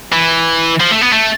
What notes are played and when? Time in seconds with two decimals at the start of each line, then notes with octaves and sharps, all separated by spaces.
0.13 E3
0.80 F3
0.91 A3
1.01 B3
1.13 A3